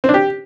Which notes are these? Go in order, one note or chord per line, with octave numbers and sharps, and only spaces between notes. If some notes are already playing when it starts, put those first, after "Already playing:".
C4
D4
G4